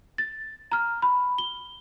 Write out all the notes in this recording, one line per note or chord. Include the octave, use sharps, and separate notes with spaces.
A6
A#5 F6
B5
G7